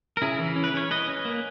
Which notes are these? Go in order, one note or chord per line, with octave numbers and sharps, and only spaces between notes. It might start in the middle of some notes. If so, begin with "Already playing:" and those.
A#4
C#3 E4 G#4
E3
C#4
B4
C#4 C#5
C#4 B4 D#5
C#4
A#3